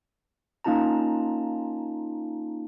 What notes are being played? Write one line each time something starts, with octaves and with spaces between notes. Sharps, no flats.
A#3 C#4 D#4 F4 A5 A#5